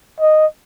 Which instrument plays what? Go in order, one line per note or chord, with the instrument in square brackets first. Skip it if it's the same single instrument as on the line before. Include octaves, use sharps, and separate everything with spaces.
[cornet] D#5